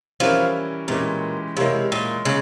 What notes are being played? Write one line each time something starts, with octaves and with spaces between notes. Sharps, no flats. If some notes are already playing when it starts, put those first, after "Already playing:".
E3 F3 G3 C#4 E4 A#4
A#2 E3 G#3 C#4 G4
C3 G#3 E4 A#4 C#5 F5
A#2
C#3 G#3